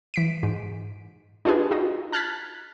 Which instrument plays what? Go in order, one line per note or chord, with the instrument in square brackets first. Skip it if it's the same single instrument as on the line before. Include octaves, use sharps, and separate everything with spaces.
[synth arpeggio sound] E3 B6 D7
G#2
D4 D#4 F4 G4 G#4 B4
D#4 F4 F#4 D#5
A5 F6 F#6 G#6 A6 B6